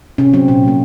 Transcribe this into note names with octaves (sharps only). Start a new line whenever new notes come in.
C3 C#4
F#3 C4
A#2 C#4
F#3 A#3